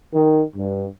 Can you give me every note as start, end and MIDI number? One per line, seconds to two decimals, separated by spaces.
0.14 0.42 51
0.55 0.84 43